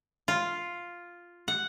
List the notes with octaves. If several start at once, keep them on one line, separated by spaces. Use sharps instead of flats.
F4
F#5